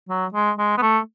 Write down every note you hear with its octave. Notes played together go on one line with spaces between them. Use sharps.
F#3
G#3
G#3
B3
A3